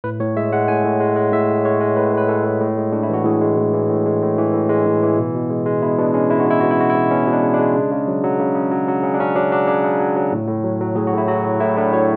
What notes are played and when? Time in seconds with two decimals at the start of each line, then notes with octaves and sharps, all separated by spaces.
0.04 A2 B4
0.20 A2 C#5
0.36 G#3 E5
0.52 G#3 F#5
0.68 A2 G#5
0.84 A2
1.00 G#3
1.16 G#3
1.32 A2 E5
1.49 A2
1.65 G#3 C#5
1.81 G#3
1.96 A2 B4
2.13 A2 B4
2.29 G#3 A4
2.45 G#3
2.61 A2
2.77 G#3
2.92 A2 D4
3.03 E4
3.09 E3 F#4
3.25 A2 G#4
3.41 G#3
3.58 A2
3.73 E3
3.90 A2
4.06 G#3
4.22 A2
4.38 E3
4.53 A2
4.69 G#3
4.86 A2
5.03 E3
5.18 B2
5.35 B2
5.50 G#3
5.66 G#3
5.82 B2 E4
5.98 B2 D4
6.14 G#3 C#4
6.30 G#3 E4
6.40 F#4
6.46 B2 E4
6.60 B2 F#4
6.71 E4
6.79 G#3 F#4
6.90 E4
6.95 G#3
7.11 B2 C#4
7.27 B2
7.32 D4
7.43 G#3
7.54 D4
7.59 G#3
7.75 C#3
7.92 C#3
8.08 F#3
8.24 F#3
8.40 C#3
8.55 C#3
8.71 F#3
8.88 F#3
9.03 C#3 C#4
9.14 D4
9.19 C#3 C#4
9.36 F#3 D4
9.52 F#3 D4
9.67 C#3 D4
9.84 C#3
9.99 F#3
10.16 F#3
10.32 A2
10.48 A2
10.64 F#3
10.80 F#3
10.96 A2 G#4
11.07 F#4
11.13 A2
11.18 E4
11.28 F#3 F#4
11.45 F#3
11.60 A2 E4
11.76 A2 D4
11.93 F#3 C#5